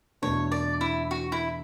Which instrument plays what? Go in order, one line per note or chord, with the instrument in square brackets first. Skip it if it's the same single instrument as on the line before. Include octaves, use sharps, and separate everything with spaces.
[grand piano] E2 B2 A3 D4 [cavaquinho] C#5
[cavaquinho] D5
E4
F#4
E4